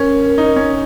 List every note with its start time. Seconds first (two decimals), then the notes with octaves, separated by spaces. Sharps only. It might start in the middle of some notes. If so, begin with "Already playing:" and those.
Already playing: C#4 A#4
0.38 D#4
0.56 C#4